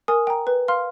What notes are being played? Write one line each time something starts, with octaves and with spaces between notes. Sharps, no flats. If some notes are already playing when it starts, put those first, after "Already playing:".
A#4 G#5 D#6
G5 A#5
B4
F5 C6 F6